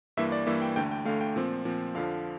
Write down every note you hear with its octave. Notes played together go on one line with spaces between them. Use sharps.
G2 E3 A#3 E5
D5
G2 E3 A#3 E5
G5
D2 D3 A3 G5
G5
D2 D3 A3 F5
G5
A#2 F3 C4
A#2 F3 C4
F2 D3 F3 F5